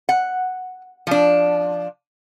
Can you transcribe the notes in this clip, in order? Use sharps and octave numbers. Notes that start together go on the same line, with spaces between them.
F#5
F3 D4